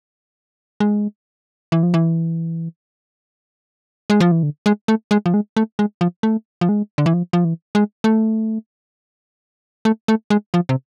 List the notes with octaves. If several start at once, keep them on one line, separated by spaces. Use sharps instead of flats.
G#3
E3
F3
E3
G#3
F3
E3
D3
G#3
A3
G#3
F3
G#3
A3
G#3
F3
A3
F3
G#3
D3
E3
F3
F3
E3
G#3
A3
A3
A3
G#3
F3
C3